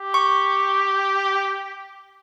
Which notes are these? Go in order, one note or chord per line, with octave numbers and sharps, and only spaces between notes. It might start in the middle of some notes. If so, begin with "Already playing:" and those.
Already playing: G4
C#6